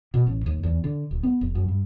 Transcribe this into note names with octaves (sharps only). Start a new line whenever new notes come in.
B2
A1
D#2
E2
D3
D1
B3
F1
F#2
G2